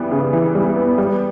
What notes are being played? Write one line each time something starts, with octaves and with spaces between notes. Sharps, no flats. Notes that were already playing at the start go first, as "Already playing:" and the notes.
Already playing: E3 G3 B3
C#3
E3
G3
B3
G3